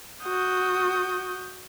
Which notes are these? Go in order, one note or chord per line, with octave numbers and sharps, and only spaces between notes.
F#4 D#6 G6